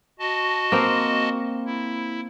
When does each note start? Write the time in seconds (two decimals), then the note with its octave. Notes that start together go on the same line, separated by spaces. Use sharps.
0.19 F#4 D#5 A5
0.72 A#3 C4 C5
1.66 E4